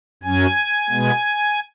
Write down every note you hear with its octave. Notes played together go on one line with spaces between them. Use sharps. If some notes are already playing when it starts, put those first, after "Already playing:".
F#2 F#3 C#4 G#5
B2 G#3 B3